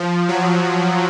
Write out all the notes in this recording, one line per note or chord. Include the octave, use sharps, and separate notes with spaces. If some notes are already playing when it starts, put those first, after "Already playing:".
Already playing: F3
F#3